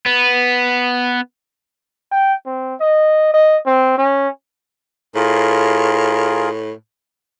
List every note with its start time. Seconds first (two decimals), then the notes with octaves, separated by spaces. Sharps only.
0.06 B3
2.12 G5
2.46 C4
2.80 D#5
3.34 D#5
3.66 C4
3.98 C#4
5.15 A2 F4 G#4 A#4